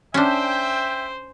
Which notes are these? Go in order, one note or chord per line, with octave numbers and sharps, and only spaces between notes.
C#4 D4 C5 E5 G5